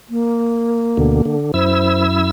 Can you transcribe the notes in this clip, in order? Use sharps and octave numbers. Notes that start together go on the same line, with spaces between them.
A#3
D2 B2 D3
D3
F#2 E4 C5 E6